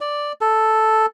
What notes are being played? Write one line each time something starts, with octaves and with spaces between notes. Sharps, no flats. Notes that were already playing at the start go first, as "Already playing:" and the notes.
D5
A4